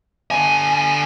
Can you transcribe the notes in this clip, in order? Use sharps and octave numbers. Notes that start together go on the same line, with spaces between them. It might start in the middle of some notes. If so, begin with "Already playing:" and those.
D3 G#5